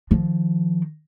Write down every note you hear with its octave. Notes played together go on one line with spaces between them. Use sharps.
D#3 F3